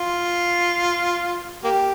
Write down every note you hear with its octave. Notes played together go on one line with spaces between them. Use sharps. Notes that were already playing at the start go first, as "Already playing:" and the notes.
Already playing: F4
A#3 G4